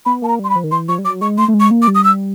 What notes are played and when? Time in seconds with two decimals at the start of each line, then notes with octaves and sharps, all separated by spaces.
0.06 B3 B5
0.22 A#3 A5
0.28 A#5
0.39 G3 C6
0.50 B5
0.55 F3
0.64 D#3
0.72 E3 C6
0.88 F3 C#6
0.98 G3
1.04 F#3 D6
1.21 G#3 C#6
1.38 A3 C6
1.48 A3
1.54 G#3
1.60 C#6
1.71 A#3
1.82 D6
1.88 G3
1.95 D#6
2.04 E6